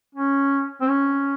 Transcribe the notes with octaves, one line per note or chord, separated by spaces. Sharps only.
C#4
C4
C#4